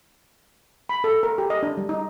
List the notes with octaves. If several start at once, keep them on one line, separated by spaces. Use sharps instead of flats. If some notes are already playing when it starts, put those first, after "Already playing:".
B5
A4
A#4
G4
D#5
D4
G3
D#4